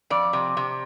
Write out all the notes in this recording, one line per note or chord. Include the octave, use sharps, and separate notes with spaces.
F2 D5
C3
C3